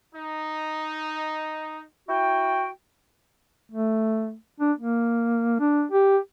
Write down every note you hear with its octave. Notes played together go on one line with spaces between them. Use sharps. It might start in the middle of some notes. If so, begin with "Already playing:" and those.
D#4
E4 F#4 G5
A3
D4
A#3
D4
G4